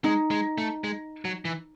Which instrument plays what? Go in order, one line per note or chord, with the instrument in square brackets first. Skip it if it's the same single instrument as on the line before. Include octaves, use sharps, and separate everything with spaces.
[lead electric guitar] G#3 [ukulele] D#4
[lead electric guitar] G#3
A3
G#3
F#3
E3